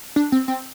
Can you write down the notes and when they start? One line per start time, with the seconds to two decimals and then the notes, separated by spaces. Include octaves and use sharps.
0.16 D4
0.32 C4
0.48 C4